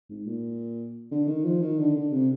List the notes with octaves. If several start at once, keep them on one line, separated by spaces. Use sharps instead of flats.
G#2
A#2
D3
D#3
F3
D#3
D3
D3
C3